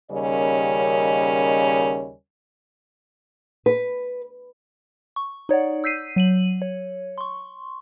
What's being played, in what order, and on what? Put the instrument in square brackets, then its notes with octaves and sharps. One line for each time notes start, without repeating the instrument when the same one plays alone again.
[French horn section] D#2 C#3 G3 C#4 A#4 D#5
[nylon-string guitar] B4
[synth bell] C#6
D#4 C#5 D5 F#5
E6 G6 B6 C7 D#7
F#3 D#7 F#7
C#5
C6 C#6